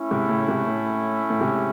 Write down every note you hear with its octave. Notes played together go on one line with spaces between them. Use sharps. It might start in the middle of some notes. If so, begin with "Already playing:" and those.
Already playing: A3 C#4 E4
G#2 C3
A2 C#3
G#2 C3
A2
A2
G#2 C3